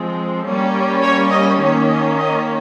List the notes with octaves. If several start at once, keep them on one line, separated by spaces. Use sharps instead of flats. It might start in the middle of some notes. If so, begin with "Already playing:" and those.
Already playing: F3 G#3 C4
G3 A#3 C#4
C#5
D#5
D#3 A#3 C#4 C#5
D#5
D#5